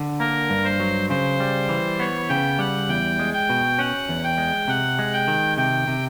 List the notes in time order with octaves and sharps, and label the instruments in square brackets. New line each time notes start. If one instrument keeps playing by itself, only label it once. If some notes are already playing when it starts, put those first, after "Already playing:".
Already playing: [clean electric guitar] D3
[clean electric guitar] A#3 [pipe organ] A#4
[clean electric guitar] G2
[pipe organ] C5
[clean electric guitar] F#3
[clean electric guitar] C#3 [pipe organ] C5
[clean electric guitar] G3
E3
[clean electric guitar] B3 [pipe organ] C#5
[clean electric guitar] C#3 [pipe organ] G5
[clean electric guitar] G3 [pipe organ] F#5
[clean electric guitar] E2 [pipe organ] G5
[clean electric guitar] G#3
[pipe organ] G5
[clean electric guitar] B2
[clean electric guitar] C#4 [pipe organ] F#5
[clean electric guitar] E2
[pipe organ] G5
[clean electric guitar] G#3
[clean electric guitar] C3 [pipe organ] F#5
[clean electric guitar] G#3
[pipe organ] G5
[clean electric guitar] D#3
[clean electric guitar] C3 [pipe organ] G5
[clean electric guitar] C3